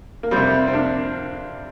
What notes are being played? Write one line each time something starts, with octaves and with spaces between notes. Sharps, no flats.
A#3
F2 C3 G3 C4
C4
A#3 D4